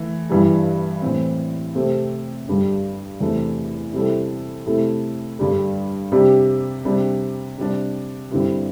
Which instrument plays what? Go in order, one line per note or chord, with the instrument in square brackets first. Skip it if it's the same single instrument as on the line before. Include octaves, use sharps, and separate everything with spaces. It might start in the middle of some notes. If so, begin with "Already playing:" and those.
Already playing: [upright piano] E3 A3
G2 E3 G3
A2 E3 C4
C3 A3 C4 G4
G2 D3 G3 D4
E2 C3 A3 D4
C3 G3 E4 A4
C3 A3 E4 A4
G2 D3 G3
C3 G3 D4 G4
C3 G3 D4
C3 G3 D4
G2 D3 C4 E4 G4